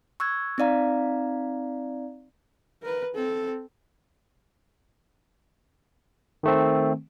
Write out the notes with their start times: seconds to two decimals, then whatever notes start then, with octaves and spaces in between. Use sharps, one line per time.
0.20 C#6 E6 F#6 G#6
0.58 C4 D#4 D5 F5 A#5
2.82 A#4 B4
3.15 C4 A4
6.43 D#3 A3 C4